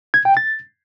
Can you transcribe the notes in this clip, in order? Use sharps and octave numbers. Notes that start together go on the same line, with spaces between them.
G#6
G5
A6